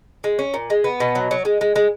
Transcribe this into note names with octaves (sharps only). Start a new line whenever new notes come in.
G#3
C#4
A#2
G#3
B3
B2
F#3
F#3
G#3
G#3
G#3